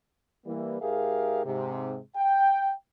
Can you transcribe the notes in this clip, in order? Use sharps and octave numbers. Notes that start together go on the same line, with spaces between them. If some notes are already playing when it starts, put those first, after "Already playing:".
E3 G3 A#3
G#2 G4 G#4 A#4 E5 F5
G#2 C3
G5